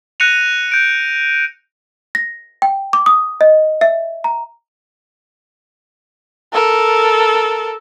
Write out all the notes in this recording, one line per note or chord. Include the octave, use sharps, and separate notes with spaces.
F#6 A#6 C#7 D#7 F7
G6 D7
A#6
G5
D6
D#6
D#5
E5
A#5
A4 A#4